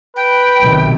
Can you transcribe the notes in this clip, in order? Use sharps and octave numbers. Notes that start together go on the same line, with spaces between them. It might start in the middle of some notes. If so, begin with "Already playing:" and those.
B4 G5
B1 C3 D#3